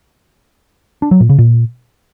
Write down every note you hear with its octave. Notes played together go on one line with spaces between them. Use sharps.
D4
F#3
A#2
C#3
A#2